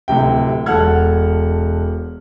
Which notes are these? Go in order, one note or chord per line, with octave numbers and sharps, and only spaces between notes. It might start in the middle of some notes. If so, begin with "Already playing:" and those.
D1 D2 C3 G5
E1 A4 F#5 A5 F6 G#6